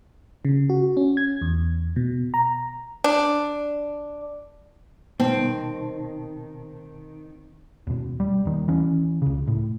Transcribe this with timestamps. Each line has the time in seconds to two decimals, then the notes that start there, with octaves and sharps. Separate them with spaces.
0.45 C#3
0.70 F#4
0.97 C#4
1.17 G#6
1.42 E2
1.96 B2
2.34 A#5
3.04 D4
5.20 B2 D#3 B3 C4 A5
7.87 D#2 B2
8.20 G3
8.45 D#2 D#3
8.68 E3 C#4
9.22 C#2 C#3
9.47 A2